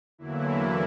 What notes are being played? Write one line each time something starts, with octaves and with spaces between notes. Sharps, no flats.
E2 D3 E3 F#3 A#3 E4